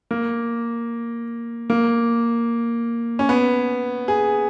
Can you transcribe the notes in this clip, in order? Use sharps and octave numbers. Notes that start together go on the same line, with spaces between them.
A#3
A#3
C#4
B3
G#4